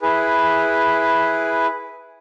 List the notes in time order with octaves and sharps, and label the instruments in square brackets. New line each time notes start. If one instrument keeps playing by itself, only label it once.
[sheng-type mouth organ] E4 G#4 B4